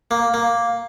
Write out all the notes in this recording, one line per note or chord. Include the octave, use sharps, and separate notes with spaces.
A#3
A#3